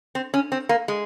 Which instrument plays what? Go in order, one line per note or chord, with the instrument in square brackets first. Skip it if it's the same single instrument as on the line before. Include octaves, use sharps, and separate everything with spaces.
[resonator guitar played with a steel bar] C4
C#4
C4
A#3
G#3